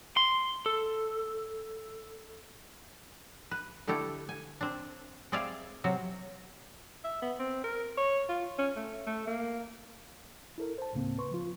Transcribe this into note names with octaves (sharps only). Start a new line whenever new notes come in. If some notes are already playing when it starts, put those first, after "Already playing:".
C6
A4
B4
D3 A3 E4 G4 A4
G#5
C4 D4
C4 G#4 D5 E5 F5
C3 F#3 C4
E5
B3
C4
A#4
C#5
F4
C#4
A3
A3
A#3
E4 A4 A#4
C5 A5
D2 A2 C#3 A#3 C4
B4 C6 C#6
F3 F4